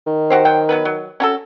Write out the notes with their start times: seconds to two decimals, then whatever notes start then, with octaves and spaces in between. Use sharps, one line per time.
0.07 D#3
0.30 F#4 G4 C5
0.45 F#3 C5 G5
0.69 F#3 B3 B4
0.85 F#3
1.20 C#4 F#4 A4